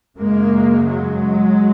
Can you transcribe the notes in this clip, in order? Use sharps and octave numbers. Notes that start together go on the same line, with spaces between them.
F#2 C#3 G#3 A#3
F#3 G#3